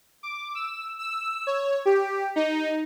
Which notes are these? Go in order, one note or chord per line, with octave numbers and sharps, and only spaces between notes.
D6
E6
E6
C#5
G4
D#4